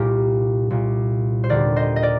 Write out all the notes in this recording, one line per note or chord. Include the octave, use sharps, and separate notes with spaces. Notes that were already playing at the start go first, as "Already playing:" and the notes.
Already playing: C2 A#2 G4 A#4
C2 A#2
C5
D#2 D3 A#4 D5
C5 D#5
D#5
A#4 D5